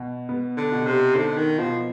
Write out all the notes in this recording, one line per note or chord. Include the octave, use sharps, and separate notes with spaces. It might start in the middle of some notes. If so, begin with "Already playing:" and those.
Already playing: B2
B3
D3
B2
C3
D3 D#4
D#3
B2 F3